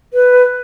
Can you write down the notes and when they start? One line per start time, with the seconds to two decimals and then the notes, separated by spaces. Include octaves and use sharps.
0.13 B4